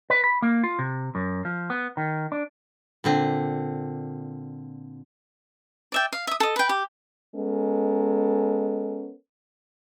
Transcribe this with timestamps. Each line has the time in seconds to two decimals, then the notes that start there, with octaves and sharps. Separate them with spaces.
0.10 B4
0.24 B5
0.42 A#3
0.64 F4
0.79 C3
1.15 F#2
1.45 F3
1.70 B3
1.97 D#3
2.32 D4
3.04 A#2 D3 C4
5.92 D5 E5 G5
6.13 F5
6.27 E5 D#6
6.40 A4 D#5
6.56 B4 G5
6.69 G4
7.36 G#3 B3 C#4 A4 A#4